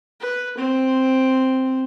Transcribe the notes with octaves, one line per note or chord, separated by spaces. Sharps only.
B4
C4